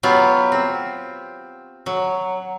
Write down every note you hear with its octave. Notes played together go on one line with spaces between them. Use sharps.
F#3 B3 F4 G4
C4
F#3